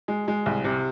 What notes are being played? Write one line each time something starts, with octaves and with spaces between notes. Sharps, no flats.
G#3
G#3
C2
C3